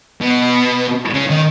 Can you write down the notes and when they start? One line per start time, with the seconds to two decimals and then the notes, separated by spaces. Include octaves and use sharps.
0.21 B2
1.14 C#3
1.30 D#3